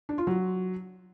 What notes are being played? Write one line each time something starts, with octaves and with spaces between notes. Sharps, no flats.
D4
F4
F#3